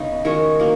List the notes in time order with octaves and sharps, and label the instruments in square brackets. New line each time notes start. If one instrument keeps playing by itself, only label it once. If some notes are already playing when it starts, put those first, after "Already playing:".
Already playing: [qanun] C#3 B3 D#4
D#3 G#3 C#4 F#4
F#3 A#3